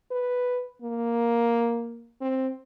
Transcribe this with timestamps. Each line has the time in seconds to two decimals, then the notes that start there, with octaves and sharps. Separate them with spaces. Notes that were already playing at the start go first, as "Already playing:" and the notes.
0.11 B4
0.82 A#3
2.21 C4